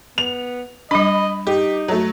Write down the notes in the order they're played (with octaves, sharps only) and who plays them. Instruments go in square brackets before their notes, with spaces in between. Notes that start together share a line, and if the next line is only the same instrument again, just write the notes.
[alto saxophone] B3 [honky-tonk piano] F7
[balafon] G3 D4 [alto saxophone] D#5 [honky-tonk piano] B5
[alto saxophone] D#4 [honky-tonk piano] G4
[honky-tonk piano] F#3 A3